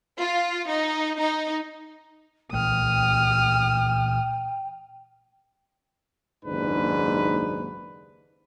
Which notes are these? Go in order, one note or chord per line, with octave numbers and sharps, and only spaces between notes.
F4
D#4
D#4
A#2 E3 A3 G5 D#6 F6
F#1 D#2 G#2 D4 B4